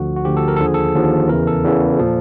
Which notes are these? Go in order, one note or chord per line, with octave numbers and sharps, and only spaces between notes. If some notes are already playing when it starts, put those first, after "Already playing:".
Already playing: D2 D3 F3 F#4
F#4
D2 D3 F3 G4
A4
A#4
A4
D#2 D3 F3
G#4
A4
D#2 D3 F3
E2 C#3 E3 A#4
A4
E2 C#3 E3
A#2 F3